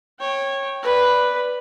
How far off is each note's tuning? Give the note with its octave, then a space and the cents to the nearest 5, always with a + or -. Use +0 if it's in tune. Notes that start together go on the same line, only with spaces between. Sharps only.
C#5 -15 G5 +0
B4 +0 D5 +0